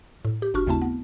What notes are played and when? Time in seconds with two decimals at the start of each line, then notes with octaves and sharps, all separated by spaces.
0.25 A2
0.42 G4
0.54 G1 D4 F#4 C#6 F6
0.67 D#2 C#3 A3 C4 E4 A5
0.82 B3